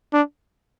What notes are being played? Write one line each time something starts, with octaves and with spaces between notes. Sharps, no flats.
D4